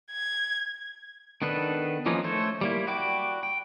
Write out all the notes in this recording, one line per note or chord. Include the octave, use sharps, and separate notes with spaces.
G#6
D#3 B3 D4 A4 B4
E3 F3 A#3 C#4 D#4
A3 A4 C5 C#5
G3 A#3 E4
F#4 D5 G5 B5 D6
G5